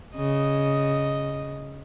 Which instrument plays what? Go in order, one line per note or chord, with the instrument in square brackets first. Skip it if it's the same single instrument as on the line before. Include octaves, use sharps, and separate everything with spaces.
[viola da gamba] C#3 D#5